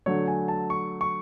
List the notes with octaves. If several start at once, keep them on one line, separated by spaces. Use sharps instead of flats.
D3 F#3 A3 C#5
G#5
A5
C#6
C#6